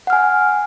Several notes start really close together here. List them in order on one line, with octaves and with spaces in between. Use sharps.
F#5 F6 G#5